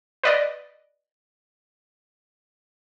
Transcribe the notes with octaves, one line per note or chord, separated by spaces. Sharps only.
B4 D5 D#5